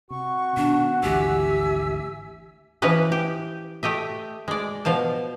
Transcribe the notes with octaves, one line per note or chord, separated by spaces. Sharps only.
C3 F#4 C#6
B2 D#3 D4
G#1 D2 E3 G4 E5 G#5 E6
E3 F3 C#4 B4 D#5
G4
A3 G4 D#5 E5
G#3 D5
B2 F3 F5 A5